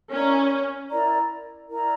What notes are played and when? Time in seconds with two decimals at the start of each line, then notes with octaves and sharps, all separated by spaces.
0.10 C#4 E4 A#4 D5 A#5
0.90 E4 A#4 D5 A#5
1.69 E4 A#4 D5 A#5